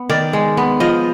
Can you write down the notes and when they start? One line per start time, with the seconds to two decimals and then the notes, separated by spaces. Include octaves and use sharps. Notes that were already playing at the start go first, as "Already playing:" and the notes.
Already playing: B3
0.09 D#3 D5
0.33 G#3
0.57 B3
0.80 F3 D#5